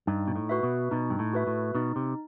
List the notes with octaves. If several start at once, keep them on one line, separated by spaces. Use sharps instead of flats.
G2 D#4
B2
A2
F#4 B4 E5
B2
B2 D#4
G2
A2
F#4 B4 E5
A2
B2 D#4
C3